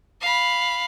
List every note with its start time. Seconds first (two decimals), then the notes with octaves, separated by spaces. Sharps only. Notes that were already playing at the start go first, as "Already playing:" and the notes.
0.21 F5 B5